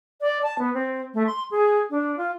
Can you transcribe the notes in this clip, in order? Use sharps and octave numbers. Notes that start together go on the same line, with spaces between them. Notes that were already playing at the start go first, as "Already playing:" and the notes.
D5
A5
B3
C4
A3
C6
G#4
D4
F4